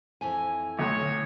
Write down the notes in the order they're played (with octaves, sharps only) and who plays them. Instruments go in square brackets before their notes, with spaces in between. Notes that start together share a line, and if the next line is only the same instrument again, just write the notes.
[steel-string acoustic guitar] F2 E3 G#5
[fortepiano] B1 A2 [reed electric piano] D3 [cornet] C#5